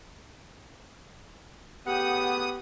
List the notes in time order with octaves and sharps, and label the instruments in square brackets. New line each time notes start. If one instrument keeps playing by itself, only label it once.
[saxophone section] A2 C#3 F#5 [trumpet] B3 [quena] G4 [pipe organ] D#6